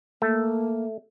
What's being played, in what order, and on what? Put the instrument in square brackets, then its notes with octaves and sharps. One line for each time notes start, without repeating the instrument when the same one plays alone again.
[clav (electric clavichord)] A3 [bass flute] A#3